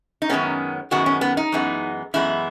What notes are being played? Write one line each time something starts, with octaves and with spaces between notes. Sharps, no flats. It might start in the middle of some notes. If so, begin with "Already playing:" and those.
D#4
F#2 D#3 G#3 B3 C#4
F#2 D#3 G#3 B3 F#4
C#4
B3
D#4
F#2 E3 G#3 B3
F#2 E3 G#3 B3 E4